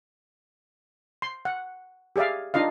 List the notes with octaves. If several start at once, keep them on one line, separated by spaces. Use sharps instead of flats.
C6
F#5
G4 G#4 D5 E5 F5
D4 D#4 F4 D#5 F5